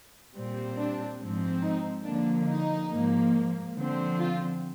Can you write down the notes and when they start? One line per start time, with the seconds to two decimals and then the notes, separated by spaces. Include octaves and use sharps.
0.34 A#2 G3 C4
0.78 D4
1.20 G#2 F3 C4
1.62 D#4
2.05 D3 F3 A#3 D4
2.47 D#4
2.90 G#2 F3 A#3
3.76 D3 F3 C4
4.19 F4